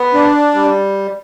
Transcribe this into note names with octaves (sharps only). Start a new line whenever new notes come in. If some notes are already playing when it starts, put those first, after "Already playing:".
Already playing: B3
D4
G3